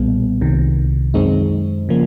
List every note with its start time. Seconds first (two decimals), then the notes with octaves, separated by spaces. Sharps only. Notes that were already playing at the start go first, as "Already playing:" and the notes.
Already playing: B1 A#2 G3 B3
0.41 C2 C3 D#3
1.14 F#2 D#3 G#3 C4 D#4
1.89 C#3 F3 A#3